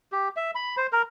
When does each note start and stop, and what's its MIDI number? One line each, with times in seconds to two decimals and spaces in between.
0.12 0.29 67
0.36 0.51 76
0.55 0.75 83
0.77 0.87 72
0.92 1.02 70